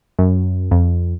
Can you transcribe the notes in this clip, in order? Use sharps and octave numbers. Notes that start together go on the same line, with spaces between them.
F#2
F2